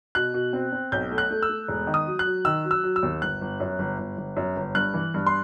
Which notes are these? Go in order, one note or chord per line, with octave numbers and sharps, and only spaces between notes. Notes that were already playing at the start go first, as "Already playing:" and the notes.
B2 F#6
B2
C4
C4
B1 G6
A3
F#6
A3
E6
A3
E1
D#3
D#6
F#3
F#6
F#3
D#3 E6
F#3
E6
F#3
E6
D#2
G1 F#6
G1
F#2
G1
G1
G1
F#2
G1
G2 F#6
E3
G2
C6